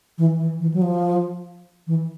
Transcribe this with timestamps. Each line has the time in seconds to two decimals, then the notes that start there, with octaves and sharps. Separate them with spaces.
0.18 E3
0.39 E3
0.60 E3
0.74 F#3
0.82 F3
1.87 E3